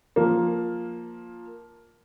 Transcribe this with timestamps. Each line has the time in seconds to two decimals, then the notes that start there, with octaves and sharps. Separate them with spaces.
0.16 F3 A#3